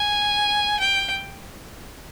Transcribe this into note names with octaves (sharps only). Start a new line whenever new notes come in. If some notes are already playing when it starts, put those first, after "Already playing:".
Already playing: G#5
G5